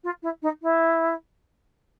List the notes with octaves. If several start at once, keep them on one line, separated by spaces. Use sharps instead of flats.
F4
E4
D#4
E4